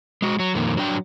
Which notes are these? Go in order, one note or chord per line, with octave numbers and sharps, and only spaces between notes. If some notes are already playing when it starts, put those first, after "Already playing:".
G#3 F#4
F#3
F2 A#2 D#3
F#3 D4 G5